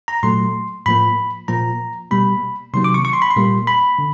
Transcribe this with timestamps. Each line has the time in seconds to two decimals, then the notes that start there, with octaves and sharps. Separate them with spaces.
0.08 A#5
0.23 A#2 F#3 A3 C6
0.86 A2 F3 A#3 B5
1.48 A#2 F3 A#3 A#5
2.11 B2 G3 A#3 B5
2.74 C3 D#3 F#3 A#3 C6
2.84 D6
2.94 C#6
3.05 C#6
3.13 C6
3.22 B5
3.30 C6
3.36 A#2 G3 A#3
3.67 B5
3.99 D3